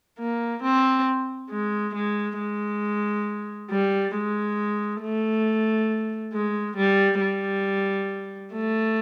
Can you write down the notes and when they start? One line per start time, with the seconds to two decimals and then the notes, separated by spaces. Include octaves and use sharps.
0.19 A#3
0.63 C4
1.50 G#3
1.95 G#3
2.39 G#3
3.70 G3
4.14 G#3
5.02 A3
6.34 G#3
6.77 G3
7.21 G3
8.54 A3